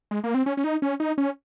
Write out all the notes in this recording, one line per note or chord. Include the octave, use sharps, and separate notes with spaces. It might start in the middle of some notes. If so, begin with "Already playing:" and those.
G#3
A#3
C4
C#4
C#4
D#4
C#4
D#4
C#4